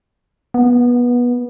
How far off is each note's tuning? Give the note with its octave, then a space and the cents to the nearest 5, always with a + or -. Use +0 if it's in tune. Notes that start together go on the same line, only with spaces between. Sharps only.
B3 -20